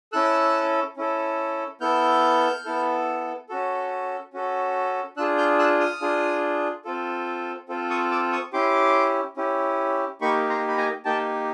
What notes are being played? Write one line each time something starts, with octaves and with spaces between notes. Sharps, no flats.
C#4 E4 A4 E6 F#6
C#4 E4 A4
B3 E4 A4 F6 G6
B3 E4 A4
C#4 F#4 A4
C#4 F#4 A4
D4 F4 G#4 E6 F#6
F6 G6
E6 F#6
D#6 F6
D4 F4 G#4
C4 F4 A4
C4 F4 A4
C#6 D#6
D6 E6
C#6 D#6
C#4 E4 G4 C6 D6
C#4 E4 G4
A#3 D#4 G4 B5 C#6
A#5 C6
B5
G#5 A#5
A#3 D#4 G4 G5 A5